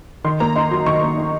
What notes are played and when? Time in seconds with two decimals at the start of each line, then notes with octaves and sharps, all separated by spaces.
0.24 D#3 C6
0.40 A#3 A#5
0.56 D#4 C6
0.71 F#3 C6
0.86 D#3 C#6
1.02 A#3
1.18 D#4